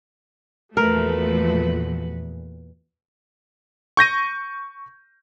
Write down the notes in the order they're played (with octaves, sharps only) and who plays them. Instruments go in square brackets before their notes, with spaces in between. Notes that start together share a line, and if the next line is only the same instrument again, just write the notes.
[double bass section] E2 A#2 [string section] F3 A3 [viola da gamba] F#4 B4 [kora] A#4
[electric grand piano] C#6 G6 A#6 D#7